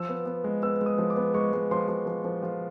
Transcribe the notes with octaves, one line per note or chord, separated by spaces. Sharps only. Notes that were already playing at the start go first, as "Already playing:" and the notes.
Already playing: F3 E6
B3
B3
G#3
B3 E6
G#3 D#6
F3
D6
B3
G#3 C#6
G#3
F3 C6
F3
F3
F3
F3